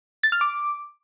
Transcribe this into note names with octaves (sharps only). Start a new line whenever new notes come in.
A6
F6
D6